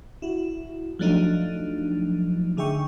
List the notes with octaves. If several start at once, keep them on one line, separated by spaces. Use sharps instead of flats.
E4 F#4
F3 F#3 A3 D4 D#4 F4
D3 D#4 G#4 E5 G5 C#6